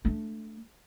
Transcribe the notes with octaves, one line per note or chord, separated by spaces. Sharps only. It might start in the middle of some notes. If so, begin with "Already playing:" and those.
A3 D4